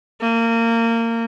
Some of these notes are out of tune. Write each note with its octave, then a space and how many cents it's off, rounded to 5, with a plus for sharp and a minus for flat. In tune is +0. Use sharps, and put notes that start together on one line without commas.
A#3 -25